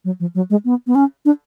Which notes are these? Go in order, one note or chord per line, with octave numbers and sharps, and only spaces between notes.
F#3
F3
F#3
G#3
B3
B3
C#4
D4